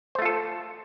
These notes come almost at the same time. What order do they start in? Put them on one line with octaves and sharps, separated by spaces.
C5 A3 F4 A4